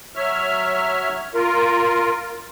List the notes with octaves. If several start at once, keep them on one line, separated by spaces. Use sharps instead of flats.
F#3 C#5 E5 F6
F4 A#4